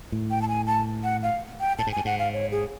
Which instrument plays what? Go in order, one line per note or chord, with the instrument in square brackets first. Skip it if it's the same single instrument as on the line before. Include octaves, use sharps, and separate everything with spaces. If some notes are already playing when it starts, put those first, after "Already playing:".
[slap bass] A2
[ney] G5
A5
G#5
A5
F#5
F5
G5
[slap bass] A2 [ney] A5
[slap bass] G#2
[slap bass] G2 [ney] G#5
[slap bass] G#2 [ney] F#5
[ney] F5
C#5
G#4